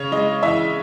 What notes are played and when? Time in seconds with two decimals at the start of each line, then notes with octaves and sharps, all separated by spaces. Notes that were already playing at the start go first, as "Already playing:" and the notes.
Already playing: C#3 C#5
0.12 G#3 D#5
0.43 E3 E5